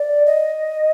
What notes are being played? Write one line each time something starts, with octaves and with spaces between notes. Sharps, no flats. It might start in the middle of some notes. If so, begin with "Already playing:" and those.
Already playing: D5
D#5